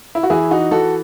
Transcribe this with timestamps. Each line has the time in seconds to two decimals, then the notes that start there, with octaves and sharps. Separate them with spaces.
0.15 E4
0.23 F#4
0.30 E3 E4 G#4
0.51 D#4 F#4
0.71 E3 F#4 A4